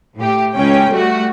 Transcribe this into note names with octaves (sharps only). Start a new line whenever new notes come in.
A2 G4
C#2 C#4 G5
G3 A3 F#4